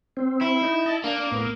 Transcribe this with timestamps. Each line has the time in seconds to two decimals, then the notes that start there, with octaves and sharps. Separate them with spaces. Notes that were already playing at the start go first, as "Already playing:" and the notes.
0.17 C4
0.41 E4
0.62 D#4
0.86 D#5 A5
1.04 A#3 D4
1.32 A2 B3